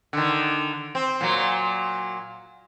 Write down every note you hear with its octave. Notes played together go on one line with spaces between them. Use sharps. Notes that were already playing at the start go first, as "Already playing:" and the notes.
D3 D#3
C4
A#2 F#3